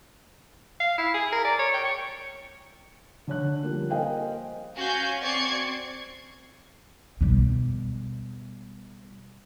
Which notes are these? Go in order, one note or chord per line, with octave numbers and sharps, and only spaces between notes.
F5
E4
G#4
A#4
D5
C#5
G5
C#6
D3 C#5 F#6
F3 G3 A#3
A#4 C5 D#5 F5 G5 G#5
C#4 F#4 F5 G#5 G6
C4 D5 C#6 G#6 C7 C#7
B2 G3